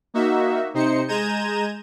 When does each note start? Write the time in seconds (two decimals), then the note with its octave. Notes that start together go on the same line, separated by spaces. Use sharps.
0.14 A#3 D#4 F#4 E5
0.74 C3 D#4 C5 C#7
1.08 G#3 A#5 G6 G#6 D#7 E7